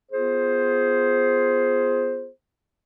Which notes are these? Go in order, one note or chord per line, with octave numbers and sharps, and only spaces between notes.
B3 F4 G#4 C5